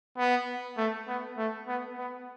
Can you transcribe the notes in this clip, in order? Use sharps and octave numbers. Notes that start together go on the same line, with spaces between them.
B3
A3
B3
A3
B3
B3